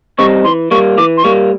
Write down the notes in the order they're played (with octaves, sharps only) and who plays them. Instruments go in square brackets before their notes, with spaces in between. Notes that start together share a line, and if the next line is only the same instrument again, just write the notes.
[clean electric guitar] G3 C4 D#4 [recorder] C#6
[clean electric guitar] E3 [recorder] C6
[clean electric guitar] G3 A#3 [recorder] C#6
[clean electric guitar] E3 [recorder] D6
[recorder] C6
[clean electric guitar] G3 A#3 [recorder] C#6